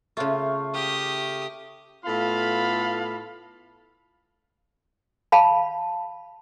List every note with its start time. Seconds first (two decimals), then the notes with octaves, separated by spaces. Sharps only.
0.17 C#3 A3 F4 F5
0.74 G4 F5 D#6
2.06 A2 B3 F4 A4 F5 B5
5.32 F5 A5 B5